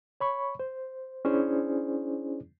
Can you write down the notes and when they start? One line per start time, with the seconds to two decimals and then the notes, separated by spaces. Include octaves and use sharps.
0.21 C#5 B5 C#6
0.60 C5
1.25 C#4 D4 E4 G#4 C5 D5